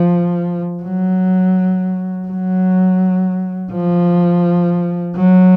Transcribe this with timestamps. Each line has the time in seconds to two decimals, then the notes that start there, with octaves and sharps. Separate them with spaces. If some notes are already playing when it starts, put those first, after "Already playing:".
Already playing: F3
0.83 F#3
2.28 F#3
3.72 F3
5.16 F#3